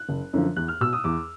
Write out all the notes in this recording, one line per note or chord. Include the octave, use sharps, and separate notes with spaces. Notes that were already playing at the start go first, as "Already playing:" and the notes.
Already playing: F#6
F#1
F#2 D3 F3
E2 F#6
F6
B2 E6
D#6
E2 D6